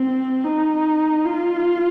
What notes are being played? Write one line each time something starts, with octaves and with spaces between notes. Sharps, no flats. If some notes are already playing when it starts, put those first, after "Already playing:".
Already playing: C4
D#4
F4